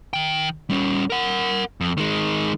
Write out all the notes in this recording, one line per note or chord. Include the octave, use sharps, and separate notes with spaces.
D#3 G5
G3 C#4
A#4 F#5
F2
D#3 G#3